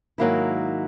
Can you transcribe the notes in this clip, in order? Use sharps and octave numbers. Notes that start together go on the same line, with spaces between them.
G#2 D#3 F#3 A#3 E4